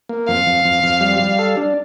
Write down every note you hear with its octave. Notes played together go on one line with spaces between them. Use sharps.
A#3
F2 F5
F2
F2
F2
G3
G3
A4
D4